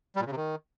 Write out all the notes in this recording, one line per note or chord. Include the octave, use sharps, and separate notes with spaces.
G3
A#2
C#3
C3
D#3